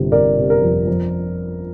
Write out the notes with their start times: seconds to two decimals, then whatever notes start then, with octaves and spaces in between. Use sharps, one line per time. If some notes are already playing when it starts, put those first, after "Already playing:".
Already playing: G1 C3
0.12 C3 A#4 D5
0.38 C3
0.50 A#4
0.62 F2
0.87 F2